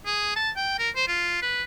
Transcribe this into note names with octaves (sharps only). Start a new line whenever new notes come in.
G#4
A5
G5
A#4
C5
F4
B4